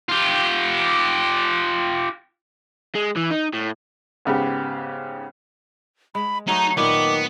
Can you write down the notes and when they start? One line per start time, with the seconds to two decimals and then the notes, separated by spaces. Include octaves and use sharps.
0.09 F4 G4
2.95 G#3
3.16 E3
3.31 D#4
3.53 A2
4.25 G#2 C#3 B3 G4
6.15 G#3 B5
6.48 F#3 A3 D#4 A#5
6.77 A#2 D#3 A3 B3 D6